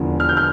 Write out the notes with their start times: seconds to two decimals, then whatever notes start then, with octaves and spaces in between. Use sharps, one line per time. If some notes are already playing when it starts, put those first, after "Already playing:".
Already playing: E1 E2 D3 F3
0.20 F6
0.29 G6
0.37 F6